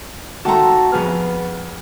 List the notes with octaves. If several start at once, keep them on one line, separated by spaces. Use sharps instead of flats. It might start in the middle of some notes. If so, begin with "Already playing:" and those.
D#3 A3 F#4 A5 A#5 C6
F2 B3 G#4 F6